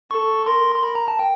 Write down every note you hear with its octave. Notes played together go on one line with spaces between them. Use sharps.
A4 C#6
A#4 C6
C6
A#4 B5
A#5
A5
G5